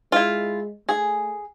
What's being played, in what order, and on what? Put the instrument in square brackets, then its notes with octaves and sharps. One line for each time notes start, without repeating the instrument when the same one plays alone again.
[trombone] G#3 [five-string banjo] E4 F4
[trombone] A3 [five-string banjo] G#4